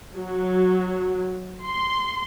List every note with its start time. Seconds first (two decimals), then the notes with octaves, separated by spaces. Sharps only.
0.17 F#3
1.66 C6